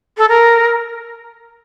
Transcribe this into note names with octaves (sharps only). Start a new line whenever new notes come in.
A4
A#4